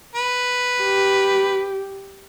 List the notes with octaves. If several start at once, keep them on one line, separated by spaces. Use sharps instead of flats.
B4
G4